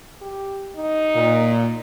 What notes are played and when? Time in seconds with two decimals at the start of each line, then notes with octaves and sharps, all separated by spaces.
0.22 G4
0.75 D#4
1.15 A#2